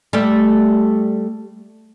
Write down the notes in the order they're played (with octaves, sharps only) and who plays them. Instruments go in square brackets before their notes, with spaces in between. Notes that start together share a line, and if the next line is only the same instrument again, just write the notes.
[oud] G3 A3